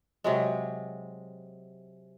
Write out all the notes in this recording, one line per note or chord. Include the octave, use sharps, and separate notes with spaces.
C3 F#3 G#3